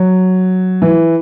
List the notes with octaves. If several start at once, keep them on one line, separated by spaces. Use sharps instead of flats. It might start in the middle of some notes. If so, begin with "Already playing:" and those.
Already playing: F#3
E3